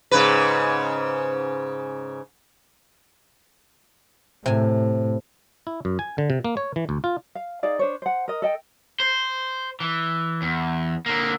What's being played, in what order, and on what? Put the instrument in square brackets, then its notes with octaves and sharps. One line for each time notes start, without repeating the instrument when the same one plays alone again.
[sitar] G#2 C#3 B4
[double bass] A2 [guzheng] C3 G#5
[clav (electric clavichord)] E4
F#2
G#5
D3
C3
A#3
C#5
E3
D2
F4
[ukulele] F5
D#4 G#4 D5 F5
D4 C5 C#5
C5 F#5
A#4 D#5
A4 D#5 G5
[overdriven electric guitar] C5
E3
E2
D3 A#3